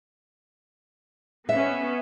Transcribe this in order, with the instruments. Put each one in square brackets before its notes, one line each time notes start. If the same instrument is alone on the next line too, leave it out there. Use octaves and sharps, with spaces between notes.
[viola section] B3 C#4 [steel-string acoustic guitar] E5